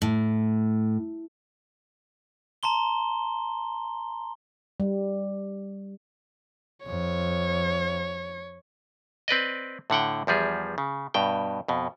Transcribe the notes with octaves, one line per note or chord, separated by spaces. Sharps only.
A2
A5 A#5 C6 G7
G3
F2 C#5
C4 B4 D5 D#5
A2 D3 F#5 G5
E2 F3 G3 G#4
C#3
G2 B2 G5
F2 B2